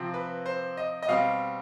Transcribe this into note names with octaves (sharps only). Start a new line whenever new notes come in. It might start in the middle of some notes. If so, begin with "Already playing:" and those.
Already playing: C3 F3 C4
B4
C5
D#5
D#5
B2 G3 C4 F5